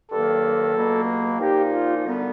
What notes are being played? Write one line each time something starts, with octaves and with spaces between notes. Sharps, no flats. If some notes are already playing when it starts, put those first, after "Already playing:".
G2 D#3 F#3 A#3 A4
C#2 B2 F#3 A#3
A#2 F3 A#3 D#4 G4
F4
F#2 D3 G3 B3